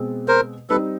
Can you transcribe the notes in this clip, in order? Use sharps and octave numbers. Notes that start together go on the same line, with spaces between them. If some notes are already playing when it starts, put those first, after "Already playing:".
Already playing: B2 G#3 C4
A#4 C5
G3 C4 D#4 A4 B4